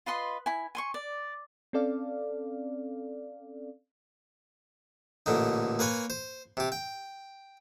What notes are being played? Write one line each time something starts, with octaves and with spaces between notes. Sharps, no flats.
F4 B4 D#5 C6
E4 G#5
G#5 C6 C#6
D5
C4 C#4 A4 D5 F5
A1 A#2 D3 D#4
A#3 B4 C#5 G#5
C5
C3 G4
G5